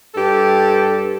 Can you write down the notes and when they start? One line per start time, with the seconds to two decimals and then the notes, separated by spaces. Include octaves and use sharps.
0.15 G2 G4 A4